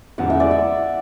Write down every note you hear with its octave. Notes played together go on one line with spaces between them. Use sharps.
E2 C#3 E3 G#3 F#5
E5
D5
E5